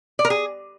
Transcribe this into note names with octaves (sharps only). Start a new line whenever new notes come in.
D5
A#4
G#4